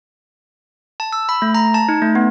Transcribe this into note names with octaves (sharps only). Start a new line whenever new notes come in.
A5
E6
B5
A3
A#5
A5
D#4
A3
B3